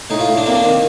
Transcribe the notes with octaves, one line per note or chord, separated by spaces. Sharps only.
A2 D#4
F4
A2
D4
A#3 C4
D4
D#3 C4